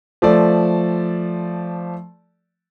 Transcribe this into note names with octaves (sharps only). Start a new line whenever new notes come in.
F3 A3 A4 D5